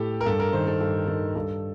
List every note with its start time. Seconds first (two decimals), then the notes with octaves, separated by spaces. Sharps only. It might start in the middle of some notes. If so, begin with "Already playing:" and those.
Already playing: A2 G4 A4
0.21 A#4
0.26 G2 A4
0.40 A#4
0.53 D#3 C5
0.67 A4
0.80 G2 A4
1.08 D#3 A4
1.35 G2 A4